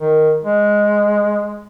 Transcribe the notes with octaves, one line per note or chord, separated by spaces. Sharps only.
D#3
G#3